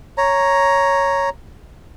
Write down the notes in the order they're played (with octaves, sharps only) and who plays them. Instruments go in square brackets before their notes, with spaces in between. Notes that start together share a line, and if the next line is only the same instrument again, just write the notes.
[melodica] C#5 A#5